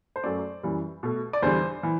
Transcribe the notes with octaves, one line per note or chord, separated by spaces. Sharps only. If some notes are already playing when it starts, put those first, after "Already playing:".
C5
F#2 F#3 A3 D5
F#2 E3 G3
B2 A3
D5
E2 D3 G3 C5
E3